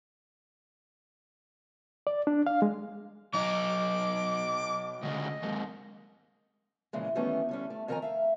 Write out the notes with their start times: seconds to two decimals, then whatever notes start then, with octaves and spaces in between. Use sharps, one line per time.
2.07 D5
2.27 D4
2.47 F5
2.62 G#3
3.34 F#3 D#4 D6
5.02 D2 C#3 D#5
5.42 D#2 G#2
6.93 A#2 C#3 E3 F3 G#3
7.15 D#3 E3 G3 A3 B3 C#4
7.49 D3 G3 C#4
7.70 A3
7.88 F2 D#3 A#4 F#5 G#5 A#5
8.02 E5 F5